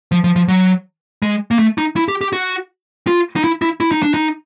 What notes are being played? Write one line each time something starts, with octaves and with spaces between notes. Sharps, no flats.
F3
F3
F3
F#3
G#3
A#3
A3
D#4
E4
G4
G4
F#4
F4
D#4
E4
E4
E4
D#4
D4
D#4